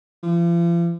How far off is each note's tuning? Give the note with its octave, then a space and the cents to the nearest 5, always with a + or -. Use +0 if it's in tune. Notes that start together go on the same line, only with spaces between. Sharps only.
F3 -45